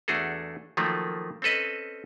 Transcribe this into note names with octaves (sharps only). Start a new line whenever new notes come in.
E2 A3 D4 F#4 G#4 A4
D#3 F3 F#3 A3 A#3
C4 C#4 A4 B4 D#5